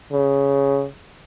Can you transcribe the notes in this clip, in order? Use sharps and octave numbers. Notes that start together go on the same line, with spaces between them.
C#3